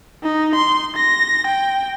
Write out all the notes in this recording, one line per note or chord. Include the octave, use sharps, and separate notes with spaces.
D#4
C6
A#6
G5